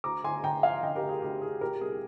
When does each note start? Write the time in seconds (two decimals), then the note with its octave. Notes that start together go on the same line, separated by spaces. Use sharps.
0.04 D2 A#5 D6
0.24 D3 G#5 C6
0.44 D3 G5 A#5
0.63 F3 F5 G#5
0.83 D3 D#5 G5
0.96 G4 A#4
1.03 D2
1.09 G#4
1.22 D2 G4
1.41 D2 G#4
1.61 A#2 G4 A#4
1.81 C2 G#4